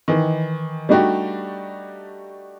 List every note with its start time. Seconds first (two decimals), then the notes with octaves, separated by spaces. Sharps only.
0.08 D#3 E3
0.89 G3 A3 D4 D#4 F#4 G4